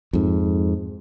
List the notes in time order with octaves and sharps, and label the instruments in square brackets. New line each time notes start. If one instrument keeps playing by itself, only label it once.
[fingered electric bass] F2 G#2